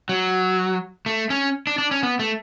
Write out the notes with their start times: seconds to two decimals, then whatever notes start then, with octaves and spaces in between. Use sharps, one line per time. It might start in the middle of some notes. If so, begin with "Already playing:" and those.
0.09 F#3
1.06 A3
1.30 C#4
1.67 D4
1.78 D4
1.91 C#4
2.03 B3
2.19 A3